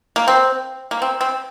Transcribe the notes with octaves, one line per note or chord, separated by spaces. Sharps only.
A#3
C4
A#3
C4
C4